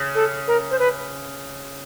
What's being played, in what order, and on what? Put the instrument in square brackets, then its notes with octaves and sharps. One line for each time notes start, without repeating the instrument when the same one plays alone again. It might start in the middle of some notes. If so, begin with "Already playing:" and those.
Already playing: [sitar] C#3
[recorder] A4
A#4
C5
B4